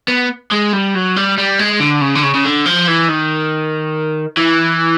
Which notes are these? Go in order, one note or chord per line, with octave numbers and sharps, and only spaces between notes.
B3
G#3
G3
F#3
G3
G3
G#3
D3
C#3
D3
C#3
C#3
D3
F3
E3
D#3
E3